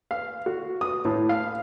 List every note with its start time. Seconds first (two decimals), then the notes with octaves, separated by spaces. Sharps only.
0.11 F5
0.46 F#4
0.81 D#6
1.05 A2
1.29 F5